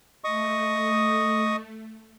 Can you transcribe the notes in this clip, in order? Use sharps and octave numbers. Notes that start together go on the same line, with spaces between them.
A3 D#5 C#6 D#6